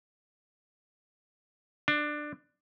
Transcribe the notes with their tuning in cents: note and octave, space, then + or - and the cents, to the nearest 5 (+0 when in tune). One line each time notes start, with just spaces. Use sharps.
D4 +15